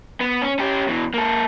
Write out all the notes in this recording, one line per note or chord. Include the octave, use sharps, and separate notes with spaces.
B3
C#4
C#4 G4
B2 E3
A#3 A4